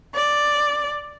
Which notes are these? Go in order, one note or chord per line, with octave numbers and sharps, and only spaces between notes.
D5